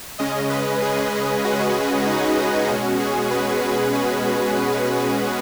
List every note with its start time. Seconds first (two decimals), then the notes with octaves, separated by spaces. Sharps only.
0.19 C#3 G#3 C#4 D#5
0.50 B4
0.82 G#4
1.44 F#4
2.06 D#4
2.69 B2 G#3 C#4 F#4
3.00 G#4
3.31 B4
3.93 G#4
4.56 B4